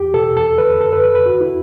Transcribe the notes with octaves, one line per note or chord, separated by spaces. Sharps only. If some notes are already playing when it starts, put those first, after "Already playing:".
Already playing: E2 G4
B2 A4
E2 A4
D3 B4
F#2 A4
B4
D3 B4
B4
E2 F#4
E4